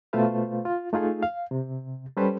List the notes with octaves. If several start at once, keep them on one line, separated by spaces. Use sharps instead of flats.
B2 A3 F4 B4 C5 F5
F4
A3 D#4 F4 G#4 A4
F5
C3
G3 C#4 G4 A4 B4 C5